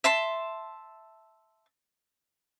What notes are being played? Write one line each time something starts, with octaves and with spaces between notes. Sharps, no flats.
E5 A5 C6